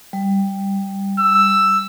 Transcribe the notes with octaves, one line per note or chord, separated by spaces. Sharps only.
G3
E6